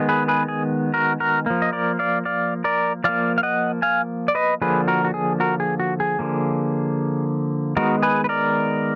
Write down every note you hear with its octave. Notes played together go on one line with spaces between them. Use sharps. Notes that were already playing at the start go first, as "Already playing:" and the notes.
Already playing: D#3 G#3 B3
G#4 B4
G#4 B4
G#4
F#4 A#4
F#4 A#4
F3 A#3
D#5
A#4 D5
D5 F5
D5 F5
A#4 D5
F3 A#3 D5 F5
F5
D#5 F#5
F5 G#5
D5
B4 D#5
D3 F3 A#3 G#4 B4
F#4 A#4
F#4
G#4
F#4 A#4
G#4
F#4
G#4
D3 F3 A#3
D#3 G#3 B3 F#4 A#4
G#4 B4
B4
A#4 D5